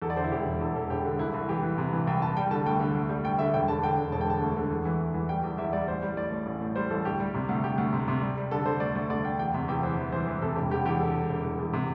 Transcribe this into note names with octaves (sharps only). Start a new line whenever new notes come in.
E2 A4
D5
D3 C5
E4
E1 G4
E1
E2 A4
E1 A4
E1 G4
D3
C2 E4
C2
E3 G4
E3
C3
E3
C2 G5
C2 A5
G3 G5
D3 A5
D2 G5
D3
D2
G3
D2 G5
D3 E5
E1 G5
D3 A5
D3 G5
E1
E1 A5
G5
D3 A5
D2
D3
E2
E3
E2
E3
G3 G5
E2
E2 E5
G3 D5
A1 C5
G3
A2 D5
A2
A1
A2
G3 C5
A1 A4
D2 G4
G3
C3
D2
D2 G4
D2
C3
C3
G3
G3
D3 A4
D3 C5
D2 D5
D2
D2 D5
D2 G5
E2 G5
C3
E2 G5
E3 C5
E3
E3 C5
E3 C5
C3 A4
E1 G4
E2 G4
E2 G4
D3 A4
E1
E1
E2
E2
C3